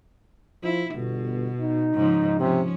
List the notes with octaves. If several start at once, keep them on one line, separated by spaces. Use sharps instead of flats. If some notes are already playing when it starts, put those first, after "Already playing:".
F3 E4
G1 B2
D#4
G#2 C#3 F3
C3 F3 C#4